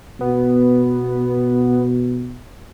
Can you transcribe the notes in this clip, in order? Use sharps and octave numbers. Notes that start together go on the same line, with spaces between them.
B2 B3